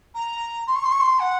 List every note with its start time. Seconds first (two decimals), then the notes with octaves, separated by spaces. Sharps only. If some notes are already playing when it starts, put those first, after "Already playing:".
0.15 A#5
0.67 C6
0.76 C#6
0.84 C6
0.92 C#6
1.00 C6
1.20 F#5